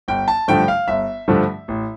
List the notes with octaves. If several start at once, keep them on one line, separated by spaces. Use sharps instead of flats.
G1 G5
A5
G2 D3 F3 A3 G5
F5
G1 E5
G2 D3 F3 A3
A1